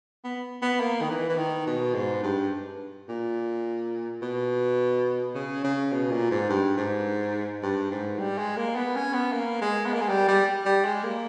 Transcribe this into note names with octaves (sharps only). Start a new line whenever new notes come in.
B3
B3
A#3
D#3
E3
E3
D#3
B2
G#2
G2
A#2
B2
C#3
C#3
B2
A#2
G#2
G2
G#2
G2
G#2
G3
G#3
A#3
B3
C#4
B3
A#3
G#3
B3
A#3
G#3
G3
G3
G3
G#3
A#3